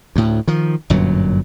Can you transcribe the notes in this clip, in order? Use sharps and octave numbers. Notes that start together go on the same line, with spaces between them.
D2 A2
D#3 F3
G1 F#2 A#2 F#3